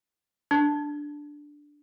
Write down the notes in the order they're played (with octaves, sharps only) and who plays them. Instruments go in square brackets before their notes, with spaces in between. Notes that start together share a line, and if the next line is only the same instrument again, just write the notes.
[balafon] D4